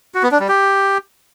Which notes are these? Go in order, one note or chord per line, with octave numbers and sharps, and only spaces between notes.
F#4
B3
D4
G3
G4